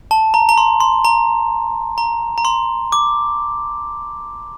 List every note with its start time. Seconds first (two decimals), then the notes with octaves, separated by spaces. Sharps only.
0.11 A5
0.34 A#5
0.49 A#5
0.57 C6
0.80 C6
1.05 A#5
1.98 A#5
2.38 A#5
2.45 C6
2.92 D6